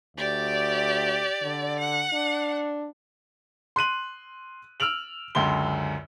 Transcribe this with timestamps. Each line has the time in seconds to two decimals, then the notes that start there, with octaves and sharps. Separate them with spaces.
0.17 D2 G4 D5
1.42 D3
1.80 F#5
2.13 D4
3.76 C6 F#6 D#7 F#7
4.80 E6 F6 D7 F7 F#7
5.35 C#2 F#2 D3 C6 G7